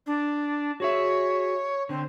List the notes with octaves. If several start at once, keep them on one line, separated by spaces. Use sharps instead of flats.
D4
F#4 G#4 C#5 E5
D3 C4